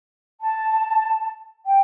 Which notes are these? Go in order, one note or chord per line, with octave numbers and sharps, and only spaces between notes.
A5
G5